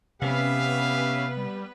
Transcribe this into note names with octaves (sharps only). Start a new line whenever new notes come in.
C3 B3 C#4 G4 B4 E5 F5
G3